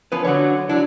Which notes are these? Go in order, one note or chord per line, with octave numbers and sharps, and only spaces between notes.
F3 B3 C#4 B4
D3 F#3 C#5 F#5
F#3 D4 E4